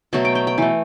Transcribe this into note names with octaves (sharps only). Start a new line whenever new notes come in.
B2 F#3 A3 A5
G5
G5
G5
E3 A3